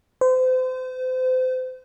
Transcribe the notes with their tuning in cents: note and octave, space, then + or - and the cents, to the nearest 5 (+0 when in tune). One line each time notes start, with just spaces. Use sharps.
C5 -35